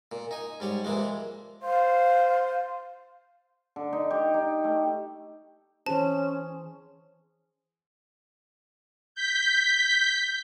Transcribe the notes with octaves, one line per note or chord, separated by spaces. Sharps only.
A#2
D#4 G#5
G#2 G3 C#5
A#2 E3 F3 G#3
C5 F5
D3
D#4
G4
D#4
A3
E3 C#4 G#4 C5 A5
G6 B6